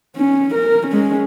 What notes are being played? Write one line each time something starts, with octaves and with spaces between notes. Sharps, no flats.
C#4
A#4
G#3 C#4